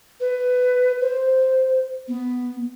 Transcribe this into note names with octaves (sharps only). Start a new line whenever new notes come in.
B4
C5
B3